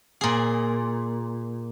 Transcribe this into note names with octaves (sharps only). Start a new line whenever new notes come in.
A#2 G#4